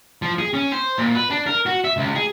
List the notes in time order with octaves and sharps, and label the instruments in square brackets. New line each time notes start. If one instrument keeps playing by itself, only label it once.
[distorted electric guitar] F3
G#4
C#4
C5
A#2
B4
D4
A#4
F#4
E5
C#2
G#4